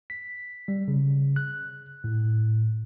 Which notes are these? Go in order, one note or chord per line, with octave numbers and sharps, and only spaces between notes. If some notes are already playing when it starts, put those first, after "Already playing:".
B6
G3
C#3
F#6
A2